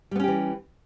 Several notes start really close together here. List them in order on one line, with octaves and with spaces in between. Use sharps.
G3 B3 C#4 G4 E3